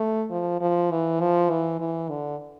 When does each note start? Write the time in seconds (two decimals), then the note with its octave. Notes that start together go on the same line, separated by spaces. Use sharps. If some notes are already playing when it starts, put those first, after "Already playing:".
Already playing: A3
0.30 F3
0.61 F3
0.91 E3
1.20 F3
1.50 E3
1.80 E3
2.09 D3